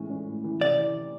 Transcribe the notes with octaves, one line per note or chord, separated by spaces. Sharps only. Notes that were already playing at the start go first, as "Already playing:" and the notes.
Already playing: A2 E3 G#3 C#4
C#4
A2
E3
C3 D5
E3